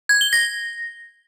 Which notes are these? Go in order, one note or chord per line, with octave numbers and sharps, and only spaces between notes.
G#6
G7
A#6